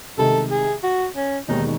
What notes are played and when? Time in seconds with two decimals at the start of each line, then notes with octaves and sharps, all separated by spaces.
0.17 C2 C3 D#3 G#3 D#4 A4
0.51 G#4
0.83 F#4
1.16 C#4
1.48 E1 D#2 D#3 G#3 D#4